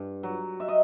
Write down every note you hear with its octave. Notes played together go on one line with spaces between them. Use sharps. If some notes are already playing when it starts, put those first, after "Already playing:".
Already playing: G2
F#3
E5
D#5